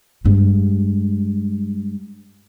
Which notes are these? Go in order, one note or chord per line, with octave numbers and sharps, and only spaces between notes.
G2 G#3